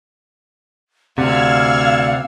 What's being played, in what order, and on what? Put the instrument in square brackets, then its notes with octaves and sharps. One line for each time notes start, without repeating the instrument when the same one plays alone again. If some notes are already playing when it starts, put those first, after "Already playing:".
[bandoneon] D2 D5 F#5 [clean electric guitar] C3 [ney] F5 [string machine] E6 F6 G#6